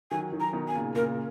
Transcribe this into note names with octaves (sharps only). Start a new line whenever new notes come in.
D#3 F#3 G#5
D#3 F#3
A#5
B2 D#3
G#5
A#2 C#3
A#2 C#3 A#4